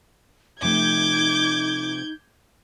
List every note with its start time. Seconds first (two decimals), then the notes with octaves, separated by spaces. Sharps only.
0.62 C3 F3 A3 D#4 D6 G6 G#6